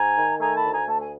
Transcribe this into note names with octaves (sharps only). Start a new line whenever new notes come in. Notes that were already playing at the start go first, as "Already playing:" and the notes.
Already playing: G#2 G#5 A#5
D#3
A3 G#5 A#5
A5 B5
D2
G#5 A#5
A3 A5
G#5